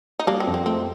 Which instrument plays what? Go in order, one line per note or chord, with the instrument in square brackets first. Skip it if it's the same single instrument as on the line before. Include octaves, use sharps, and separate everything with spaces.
[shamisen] D#4
[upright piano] G3 [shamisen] A#3 D4
[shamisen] C4
[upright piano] F2
[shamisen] C4
[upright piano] A3 [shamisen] C4